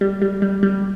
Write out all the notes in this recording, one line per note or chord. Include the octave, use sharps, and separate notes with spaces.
G3
G3
G3
G3